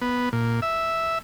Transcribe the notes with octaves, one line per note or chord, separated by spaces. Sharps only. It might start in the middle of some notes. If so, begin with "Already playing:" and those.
B3
A#2
E5